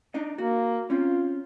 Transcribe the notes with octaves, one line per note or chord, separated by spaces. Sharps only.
D4 D#4 D#5
A#3 F#4
C4 C#4 F4